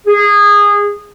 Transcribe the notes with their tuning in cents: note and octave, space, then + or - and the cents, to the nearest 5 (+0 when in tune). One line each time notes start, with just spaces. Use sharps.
G#4 -20